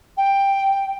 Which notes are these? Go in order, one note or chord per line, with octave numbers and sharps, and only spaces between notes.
G5